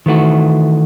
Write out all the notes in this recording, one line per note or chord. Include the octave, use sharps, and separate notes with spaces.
D#3 E3 A3 F#4